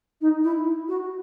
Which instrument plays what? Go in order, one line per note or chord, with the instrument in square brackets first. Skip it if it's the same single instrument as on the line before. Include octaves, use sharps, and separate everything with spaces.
[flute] D#4
E4
F#4